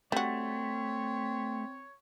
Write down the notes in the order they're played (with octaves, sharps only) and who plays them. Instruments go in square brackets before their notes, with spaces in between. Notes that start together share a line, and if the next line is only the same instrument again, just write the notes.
[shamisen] G3 F#4 [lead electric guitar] A3 [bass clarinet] C4 [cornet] C#5